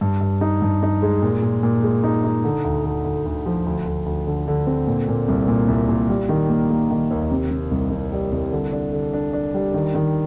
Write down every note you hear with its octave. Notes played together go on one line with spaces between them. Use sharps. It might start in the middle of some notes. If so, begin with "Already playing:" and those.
G2
G2
D#4
G2
D#4
G#3
A#2
A#2
A#2
G#3
D#4
D#4
D3
D2
D3
D2
D2
F3
D2
D2
D2
D3
D3
C4
A#2
A#2
C2
A#2
C2
A#2
G3
D#3
A#3
A#3
D#3
D#2
C3
C3
C2
C2
G3
C2
D3
D4
D3
D4
D4
G3
D#3
D#3